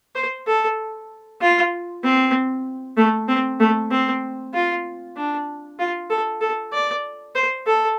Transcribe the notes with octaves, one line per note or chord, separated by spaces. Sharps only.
C5
A4
F4
C4
A3
C4
A3
C4
F4
D4
F4
A4
A4
D5
C5
A4